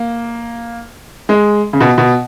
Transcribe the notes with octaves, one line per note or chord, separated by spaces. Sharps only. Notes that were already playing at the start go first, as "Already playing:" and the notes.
Already playing: A#3
G#3
C#3
B2
B2